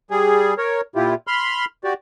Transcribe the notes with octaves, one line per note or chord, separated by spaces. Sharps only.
G3 G#4
A#4 C#5
A#2 E4 F4 G4
B5 C6 F6
F#4 G4 D5